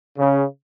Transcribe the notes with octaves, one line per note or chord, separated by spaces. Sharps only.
C#3